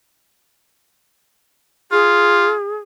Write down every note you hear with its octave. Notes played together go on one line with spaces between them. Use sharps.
F4 G#4